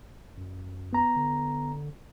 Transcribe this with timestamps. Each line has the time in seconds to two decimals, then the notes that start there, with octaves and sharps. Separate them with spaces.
0.37 F#2
0.93 B3 A#5
1.16 D3